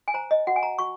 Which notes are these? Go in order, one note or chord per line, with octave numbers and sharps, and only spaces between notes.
G#5
C5 A#5
D#5
F#4 F#5
G#5
A#5
F#4 C#6